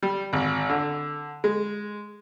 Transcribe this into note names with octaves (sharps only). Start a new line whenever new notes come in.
G3
G#1
D3
G#3